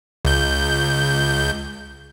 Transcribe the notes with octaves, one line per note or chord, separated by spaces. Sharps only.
C#2 G6